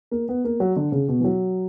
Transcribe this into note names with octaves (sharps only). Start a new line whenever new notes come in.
A#3
B3
A#3
F#3
D3
C#3
B2
E3
F#3